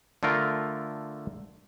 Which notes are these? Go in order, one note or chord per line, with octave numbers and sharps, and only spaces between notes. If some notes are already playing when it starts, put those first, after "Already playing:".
D3 A3 F4 A#4